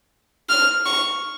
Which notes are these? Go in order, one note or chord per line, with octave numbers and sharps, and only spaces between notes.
F6
C#6